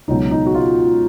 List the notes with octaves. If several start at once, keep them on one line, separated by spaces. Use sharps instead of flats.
C#2 B2 F#3 D#4
D#4
F#4
F4